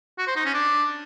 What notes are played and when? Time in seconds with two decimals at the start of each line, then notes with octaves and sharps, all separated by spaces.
0.18 F#4
0.27 C5
0.36 D#4
0.45 C#4
0.54 D4